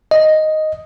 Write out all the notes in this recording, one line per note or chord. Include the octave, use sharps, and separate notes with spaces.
D#5